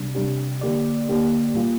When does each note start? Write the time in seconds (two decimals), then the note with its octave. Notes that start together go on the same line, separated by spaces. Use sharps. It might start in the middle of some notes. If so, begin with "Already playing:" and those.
Already playing: C3 G3 D4
0.15 C3 G3 D4 G4
0.61 D3 A#3 G4 D5
1.09 D3 A#3 G4 D5
1.54 A#2 G3 A#3 F4